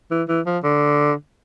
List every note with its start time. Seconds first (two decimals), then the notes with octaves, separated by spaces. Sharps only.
0.10 E3
0.28 E3
0.46 F3
0.63 D3